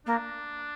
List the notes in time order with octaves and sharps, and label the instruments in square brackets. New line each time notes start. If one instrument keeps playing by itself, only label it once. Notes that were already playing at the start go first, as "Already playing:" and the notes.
[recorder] A#3 [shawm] D4